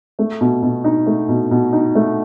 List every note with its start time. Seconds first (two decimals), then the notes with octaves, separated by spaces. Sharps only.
0.19 A3
0.41 B2
0.62 B2
0.84 D#4
1.07 A3
1.29 B2
1.51 B2
1.73 D#4
1.95 A3